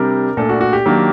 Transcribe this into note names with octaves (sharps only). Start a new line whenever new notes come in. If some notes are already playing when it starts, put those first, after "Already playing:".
Already playing: C3 G3 D4 A#4
A#2 A3 D4 A4
F#4
F#4
G4
D#3 F#3 A#3 D4